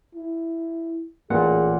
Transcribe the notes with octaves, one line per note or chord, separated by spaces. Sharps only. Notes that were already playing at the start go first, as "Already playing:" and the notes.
E4
A1 A#2 G#4 F#5